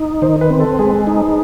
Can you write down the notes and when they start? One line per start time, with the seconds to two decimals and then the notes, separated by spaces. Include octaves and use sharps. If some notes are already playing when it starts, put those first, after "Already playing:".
Already playing: D#4
0.22 D#3 C5
0.41 B4
0.50 C4
0.60 A4
0.79 G#3 G#4
1.07 D#4